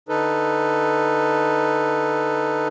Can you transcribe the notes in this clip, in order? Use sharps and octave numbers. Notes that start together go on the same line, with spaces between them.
D3 D#4 A4 B4